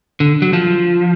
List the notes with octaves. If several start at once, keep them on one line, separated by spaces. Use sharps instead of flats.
D3
F#3
F3